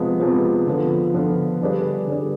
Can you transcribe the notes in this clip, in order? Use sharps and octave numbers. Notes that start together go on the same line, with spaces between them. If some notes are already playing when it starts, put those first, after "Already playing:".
Already playing: C3 F3 G#3 B3
C3 F3 G#3 B3
D3 F3 B3 F4
D3 F3 B3 F4
D3 G3 D4 G#4 B4
D3 G3 D4 G#4 B4